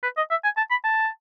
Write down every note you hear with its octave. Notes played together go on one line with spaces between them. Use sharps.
B4
D#5
E5
G#5
A5
B5
A5